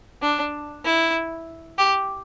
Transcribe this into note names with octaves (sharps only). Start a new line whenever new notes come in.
D4
E4
G4